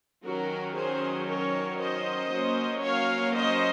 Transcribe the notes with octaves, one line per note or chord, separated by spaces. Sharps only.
D#3 F#3 C#4 F#4 A#4
G#4 C5
A#4 C#5
C5 D#5
F#3 A#3 C#4
C#5 F5
C5 D#5